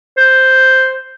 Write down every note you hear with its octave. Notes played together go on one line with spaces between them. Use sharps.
C5